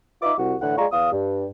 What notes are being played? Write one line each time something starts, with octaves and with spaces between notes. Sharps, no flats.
D#4 F4 B4 E5 D6
C2 F#4
A2 D3 E3 F#5
G#3 F4 D5 F5 A#5 C#6
E2 F5 D#6
G2